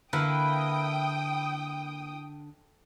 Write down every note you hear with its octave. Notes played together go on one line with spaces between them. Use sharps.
D3 A#3 E4 B4 G5 D#6